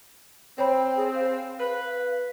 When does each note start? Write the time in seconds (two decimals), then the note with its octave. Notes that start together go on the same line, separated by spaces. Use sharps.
0.58 C4 C5 C#5 G5 B5
0.97 G#4
1.14 F5
1.60 B4